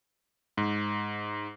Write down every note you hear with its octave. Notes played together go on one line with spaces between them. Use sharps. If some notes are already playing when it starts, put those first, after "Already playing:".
G#2